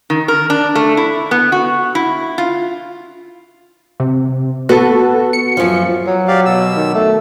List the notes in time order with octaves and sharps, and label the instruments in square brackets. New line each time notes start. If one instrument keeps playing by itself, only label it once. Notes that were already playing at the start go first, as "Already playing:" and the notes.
[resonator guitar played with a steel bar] D#3
A#4
D4
A3
E4
B3
F#4
E4
F4
[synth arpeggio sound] C3
[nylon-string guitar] B3 [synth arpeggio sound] F#4 A4
[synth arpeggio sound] C#7
[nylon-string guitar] F#2 F3
[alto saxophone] F#3
[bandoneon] G4 D5 F5
B2 E6
[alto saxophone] D#3
A3